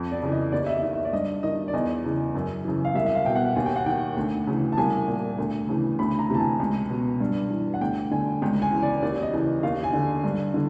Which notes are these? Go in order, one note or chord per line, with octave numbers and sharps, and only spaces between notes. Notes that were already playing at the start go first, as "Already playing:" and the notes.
Already playing: F2
D5
C#3 E3
D#5
D#2 D5
E5
D#5
D#3
E5
D5
G2 D#5
D#3 D#5
D5
E2 D#5
C#3 E3
F#2
C#3 E3
F5
C2 E5
E5
F5
B2 G5
F#5
D#2 G#5
G5
F#5
D#3 G5
D2
C#3 E3
A5
C2 G#5
A#2
D2
C#3 E3
D2 B5
A#5
C3 E3 A5
G#5
C#2
B2
G2
E3
F#5
D2 G5
D3 G#5
C#2 G5
G#5
C#3 E3
D5
D#2 D5
D#5
C#3 E3
D#2 F5
G#5
D3
G2
D3